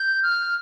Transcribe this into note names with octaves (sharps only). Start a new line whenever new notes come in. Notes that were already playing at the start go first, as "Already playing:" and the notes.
Already playing: G6
F6